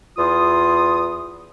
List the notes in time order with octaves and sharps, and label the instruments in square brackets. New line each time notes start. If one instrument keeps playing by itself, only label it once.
[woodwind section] E2 F4 D#6